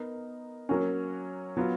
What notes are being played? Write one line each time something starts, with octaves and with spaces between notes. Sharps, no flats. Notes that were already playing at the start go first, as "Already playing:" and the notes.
Already playing: B3 D#4 A#4
F#3 A#3 C#4 F#4
F#3 B3 F4